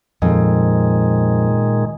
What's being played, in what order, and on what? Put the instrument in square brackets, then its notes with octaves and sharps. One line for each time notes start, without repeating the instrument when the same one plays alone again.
[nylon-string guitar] F2 [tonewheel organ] A#2 D#3 G#3